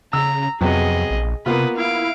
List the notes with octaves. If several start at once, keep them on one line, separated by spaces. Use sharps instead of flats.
C#3 A#5 E6
F2 C3 F#3 B3 G#4 D#5
A#1
C3 A#3 B3 F4 B4 D#6
E4 F5 D7